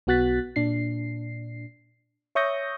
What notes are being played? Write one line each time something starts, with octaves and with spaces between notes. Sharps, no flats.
B1 B3 F#4 F#6 A6 B6
A#2 D4 C7
C#5 E5 C#6 D#6 G6 A#6